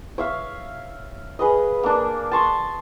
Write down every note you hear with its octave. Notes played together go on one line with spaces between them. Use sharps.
C#5 E5 F5
G#4 B4 D#5
A#3 D4
A5 C6 C#6 D#6